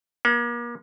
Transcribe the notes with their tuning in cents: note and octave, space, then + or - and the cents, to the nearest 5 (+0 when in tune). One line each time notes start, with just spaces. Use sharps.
A#3 +40